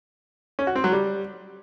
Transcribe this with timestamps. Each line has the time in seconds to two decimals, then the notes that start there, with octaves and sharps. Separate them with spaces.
0.59 C#4
0.67 F#4
0.75 C4
0.84 F#3
0.92 G3